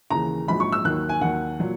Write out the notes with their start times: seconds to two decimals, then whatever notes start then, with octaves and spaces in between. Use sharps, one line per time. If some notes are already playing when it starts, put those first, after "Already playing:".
0.10 D#2 C#3 E3 A#5
0.48 A#1 G#2 F#3 B5
0.60 C#6
0.72 E6
0.85 D#2 D#3 F#3 F#6
1.09 G#5
1.21 D#2 D#3 F#3 F#5
1.60 A#2 F#3